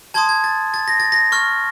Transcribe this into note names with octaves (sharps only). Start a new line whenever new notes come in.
A5 C6 D#6 G#6
G#6
A6
A6
A#6
A6
A#6
C#6 F6